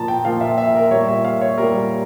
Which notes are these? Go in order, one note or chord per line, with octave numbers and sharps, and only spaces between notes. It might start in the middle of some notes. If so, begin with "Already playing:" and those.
Already playing: A#2 F3 A5 A#5
G5
A#2 F3 F5
E5
E5
A#4
A#2 G3 C#5
E5
F5
C#5
A#2 G3 A#4